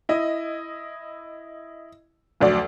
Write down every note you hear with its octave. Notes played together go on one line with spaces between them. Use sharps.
E4 D#5
F1 D2 F#3 D5